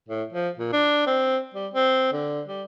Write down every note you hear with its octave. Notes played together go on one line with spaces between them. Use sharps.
A2
F3
A#2
D4
C4
G3
C4
D3
G3